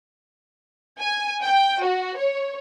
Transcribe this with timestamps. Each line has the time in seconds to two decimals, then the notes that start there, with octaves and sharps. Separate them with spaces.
1.00 G#5
1.43 G5
1.83 F#4
2.17 C#5